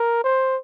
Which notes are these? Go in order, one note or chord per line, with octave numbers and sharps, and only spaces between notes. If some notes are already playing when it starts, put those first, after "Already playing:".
Already playing: A#4
C5